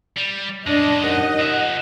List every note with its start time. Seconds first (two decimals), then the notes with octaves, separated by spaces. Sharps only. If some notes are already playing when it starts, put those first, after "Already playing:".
0.17 G3
0.67 F#2 G#3 D4 D#5
1.02 D#2 D#4 F#5
1.39 F3 E5